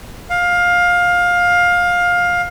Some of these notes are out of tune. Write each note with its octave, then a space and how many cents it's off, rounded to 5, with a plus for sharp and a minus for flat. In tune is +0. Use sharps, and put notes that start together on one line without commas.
F5 +20